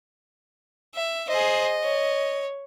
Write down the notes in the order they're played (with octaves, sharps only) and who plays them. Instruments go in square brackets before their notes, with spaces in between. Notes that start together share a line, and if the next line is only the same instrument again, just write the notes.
[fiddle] E5
[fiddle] G#4 C5 [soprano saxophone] D#5
[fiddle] C#5